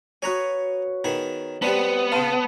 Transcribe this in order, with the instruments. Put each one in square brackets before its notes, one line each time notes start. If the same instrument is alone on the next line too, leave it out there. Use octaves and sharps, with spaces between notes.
[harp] F#4 B4 C#5 [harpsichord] G#5 A#5 D#6
[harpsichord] D#3 B3 G#4
[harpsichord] G3 C4 D4 [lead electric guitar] B3
[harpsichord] C#3 F5 [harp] A5 B5 C6